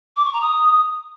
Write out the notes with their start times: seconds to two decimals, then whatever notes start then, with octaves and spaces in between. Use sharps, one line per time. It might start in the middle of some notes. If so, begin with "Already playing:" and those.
0.16 D6
0.24 C#6
0.33 A#5
0.41 D#6